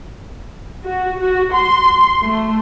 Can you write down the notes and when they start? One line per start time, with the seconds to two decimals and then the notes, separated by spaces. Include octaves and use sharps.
0.84 F#4
1.19 F#4
1.53 C6
2.21 A3